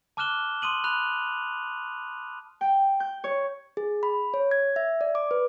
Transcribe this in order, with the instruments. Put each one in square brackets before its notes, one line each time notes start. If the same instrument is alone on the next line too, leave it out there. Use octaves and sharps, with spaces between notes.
[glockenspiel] A5 D6 F6 F#6 E7 G7
C6 D#6 D#7 F#7
B5 F#6 F7
[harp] G5
G6
C#5
[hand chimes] G#4
B5
C#5
G#6
E5
D5
D6
B4